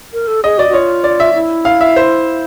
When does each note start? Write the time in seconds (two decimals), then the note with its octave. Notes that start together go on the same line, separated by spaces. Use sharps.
0.13 A#4
0.27 A4
0.44 G#4 D#5
0.58 F#4 D5
0.69 F#4
0.73 F4 C#5
1.04 D5
1.20 E5
1.34 E4
1.65 F5
1.81 E5
1.96 C5